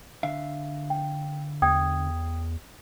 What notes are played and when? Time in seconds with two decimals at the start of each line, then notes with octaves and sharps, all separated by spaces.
0.23 D3 E5 F5
0.90 G5
1.62 E2 G5 D#6 G#6